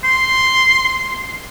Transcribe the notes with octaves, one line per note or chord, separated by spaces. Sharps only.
C6